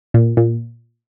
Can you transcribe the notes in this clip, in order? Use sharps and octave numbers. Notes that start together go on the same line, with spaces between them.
A#2
A#2